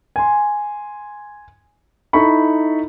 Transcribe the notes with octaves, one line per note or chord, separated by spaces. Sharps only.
G#5 C6
D#4 E4 A4 B5 C#6